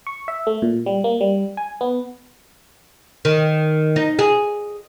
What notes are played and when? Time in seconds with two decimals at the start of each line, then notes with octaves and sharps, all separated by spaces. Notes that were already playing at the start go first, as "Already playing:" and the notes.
0.07 C#6
0.28 E5
0.47 A3
0.62 A#2
0.86 G3
1.04 A#3
1.21 G3
1.57 G#5
1.81 B3
3.25 D#3
3.96 D#4
4.19 G#4